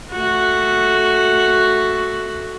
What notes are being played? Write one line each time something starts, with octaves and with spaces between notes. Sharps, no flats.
A3 F#4